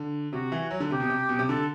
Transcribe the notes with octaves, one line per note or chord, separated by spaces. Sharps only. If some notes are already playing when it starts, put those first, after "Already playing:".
Already playing: D3
C3 F#4
E3
F#3
D3
C3 G4
B2
C3
B2
C3
D3 A4